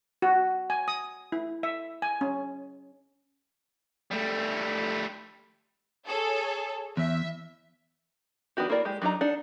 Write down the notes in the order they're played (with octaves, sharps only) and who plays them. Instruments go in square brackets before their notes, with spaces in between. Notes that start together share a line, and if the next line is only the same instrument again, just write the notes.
[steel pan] F#4
G#5
D#6
E4
E5
G#5
C#4
[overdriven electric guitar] G3 A3
[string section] G#4 A4 C#5
[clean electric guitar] E2 [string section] E5
[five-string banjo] D#3 B3 D4 F#4 G4
A#3 E4 A#4 D5
G#3 G4
F#3 D4 D#4 A#5
D4 D#4 F#5